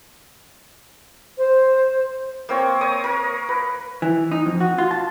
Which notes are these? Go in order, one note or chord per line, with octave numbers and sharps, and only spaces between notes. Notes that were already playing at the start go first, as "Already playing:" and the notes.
C5
A#3 C4 C#5
A#4 C#5 D#6
A#4
B4
E3
D#4
F2
F#4
F4
A5